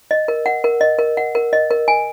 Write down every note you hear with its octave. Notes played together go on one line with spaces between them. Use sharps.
D#5
A#4
F#5
A#4
D#5
A#4
F#5
A#4
D#5
A#4
G#5